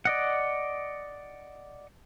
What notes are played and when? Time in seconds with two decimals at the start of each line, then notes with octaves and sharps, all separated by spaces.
0.05 D5 D#5 F#5